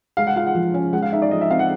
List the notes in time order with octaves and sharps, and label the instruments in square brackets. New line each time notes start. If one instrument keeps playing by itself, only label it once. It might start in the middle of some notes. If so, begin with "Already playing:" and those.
[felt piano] G#3 [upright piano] F5
[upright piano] F#5
[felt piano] F4 [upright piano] F5
[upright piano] F#5
[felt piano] F3
C#4
[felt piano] G#3 [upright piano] F#5
[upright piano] F5
[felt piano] D#4 [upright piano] E5
[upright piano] D5
[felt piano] F3 [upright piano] D#5
[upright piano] E5
[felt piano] C4 [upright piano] F5
[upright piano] F#5